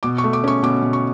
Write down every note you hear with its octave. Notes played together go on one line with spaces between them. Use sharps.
B2 D6
C#6
A3
D6
C#4 C#6
B2 D6
B2
C#6